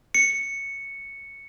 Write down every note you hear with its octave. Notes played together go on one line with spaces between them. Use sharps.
C#7